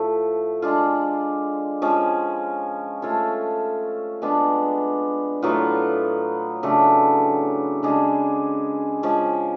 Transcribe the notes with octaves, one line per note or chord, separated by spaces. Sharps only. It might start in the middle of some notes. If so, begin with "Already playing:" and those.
Already playing: A2 F3 A3
G#3 D4 F4
F3 G#3 C#4
A3 F4 A4 C#5
G#3 B3 D4 F4
A2 F#3 B3 F4
C#3 F#3 A3 D4
C#3 G#3 D4 G#4
F3 G#3 C#4